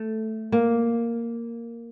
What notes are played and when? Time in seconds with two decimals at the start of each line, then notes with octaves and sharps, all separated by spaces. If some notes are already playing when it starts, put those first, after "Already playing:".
Already playing: A3
0.52 A#3